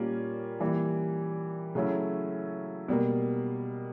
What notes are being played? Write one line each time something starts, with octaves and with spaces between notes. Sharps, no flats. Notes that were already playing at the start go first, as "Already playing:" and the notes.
Already playing: A#2 G3 A#3 C#4 F4
E3 G3 A#3
C#3 F#3 A3 C#4 E4
B2 G3 A#3